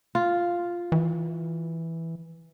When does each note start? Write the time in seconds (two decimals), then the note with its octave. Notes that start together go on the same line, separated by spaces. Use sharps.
0.15 F4
0.92 E3